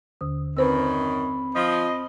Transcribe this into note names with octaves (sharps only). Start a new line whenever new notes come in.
D#2 D3 D#6
F#2 D#3 C4 B4 C5 B5 E6
F3 D#5